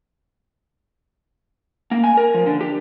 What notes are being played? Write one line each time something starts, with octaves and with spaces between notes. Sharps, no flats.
A#3
G#5
A#4
F3
D3
G4